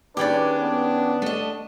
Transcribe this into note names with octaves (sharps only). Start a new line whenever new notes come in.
D#2 C#4 D4 G4 G#4 B4 D5
B3
A3 D#5